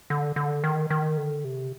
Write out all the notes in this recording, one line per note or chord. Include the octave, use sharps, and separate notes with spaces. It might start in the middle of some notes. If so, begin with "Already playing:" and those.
D3
D3
D#3
D#3
D3
C3